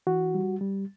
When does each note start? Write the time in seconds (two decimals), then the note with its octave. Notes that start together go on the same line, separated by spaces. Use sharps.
0.07 E3 F#4
0.34 G3
0.61 G3